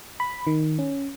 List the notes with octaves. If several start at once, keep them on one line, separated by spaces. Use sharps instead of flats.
B5
D#3
C#4